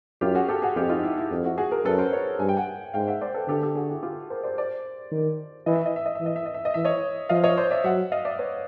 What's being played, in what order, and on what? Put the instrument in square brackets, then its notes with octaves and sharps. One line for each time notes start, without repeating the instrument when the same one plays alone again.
[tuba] F#2 [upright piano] F4 G4
[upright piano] F#4 G#4
G4 A4
F#4 G#4
[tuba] F2 [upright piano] F4 G4
[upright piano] D#4 F4
E4
E4
[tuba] F2
[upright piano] E4 F#4
F#4 G#4
G#4 A#4
[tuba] F#2 [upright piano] A4 B4
[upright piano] A#4 C5
B4 C#5
[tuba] G2 [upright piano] G#5
[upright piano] G5
F#5 G#5
[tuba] G#2 [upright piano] F5 G5
[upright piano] E5 F#5
C5 D5
A4 B4
[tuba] D3 [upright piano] G4 A4
[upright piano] G4 A4
F#4 G#4
E4 F#4
F4 G4
A#4 C5
C5 D5
C5 D5
[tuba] D#3
[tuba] E3 [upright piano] D#5
[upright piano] E5
D#5
E5
D#5
E5
[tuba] E3
[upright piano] D#5
E5
D#5
E5
D#5
[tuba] E3 [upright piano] E5
[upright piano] C#5 D#5
[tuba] F3 [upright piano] D#5 F5
[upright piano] C#5 D#5
C5 D5
D5 E5
[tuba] F#3 [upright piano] E5 F#5
[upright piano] D#5 F5
D5 E5
B4 C#5